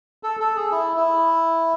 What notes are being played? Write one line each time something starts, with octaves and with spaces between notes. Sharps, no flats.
A4
A4
G#4
E4
E4